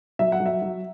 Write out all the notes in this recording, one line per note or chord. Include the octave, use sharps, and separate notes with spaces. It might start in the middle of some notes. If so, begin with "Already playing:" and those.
F#3 E5
F#5
F#3
E5
F#3